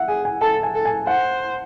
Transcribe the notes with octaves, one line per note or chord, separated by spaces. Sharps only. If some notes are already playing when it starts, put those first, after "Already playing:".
Already playing: E5 F#5
G#4 G#5
G#5
A4 A5
G#5
A4
G#5
C5 F#5